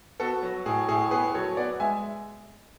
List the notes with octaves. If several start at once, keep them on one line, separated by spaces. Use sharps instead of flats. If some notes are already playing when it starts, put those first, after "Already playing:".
B3 F#4 A4
F#3 F#4
A2 G#4
A2 G#4
B3 G#4 B4
F#3 A4 C#5
B3 D5 F#5
G#3 E5 G#5